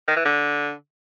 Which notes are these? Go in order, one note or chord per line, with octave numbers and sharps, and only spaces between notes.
D#3
E3
D3